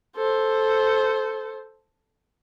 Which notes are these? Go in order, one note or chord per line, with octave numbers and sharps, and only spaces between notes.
A4 C5